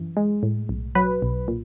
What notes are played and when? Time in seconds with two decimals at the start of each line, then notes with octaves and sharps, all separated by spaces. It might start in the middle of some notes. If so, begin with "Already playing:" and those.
Already playing: F#2 E3
0.17 G#3
0.43 A2
0.69 B1
0.95 F#3 B4
1.22 B1
1.48 A#2